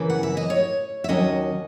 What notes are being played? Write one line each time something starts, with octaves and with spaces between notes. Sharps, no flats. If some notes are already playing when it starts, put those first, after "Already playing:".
Already playing: C#3 E3 A#3 B4
F#5
E5
D#5
C#5
E5
D#2 D#3 F#3 C#4 D#5